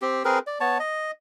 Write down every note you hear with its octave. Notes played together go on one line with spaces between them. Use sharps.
C4 G4
C4 G#4 A#4 B4
D5
B3 C#5 A5
D#5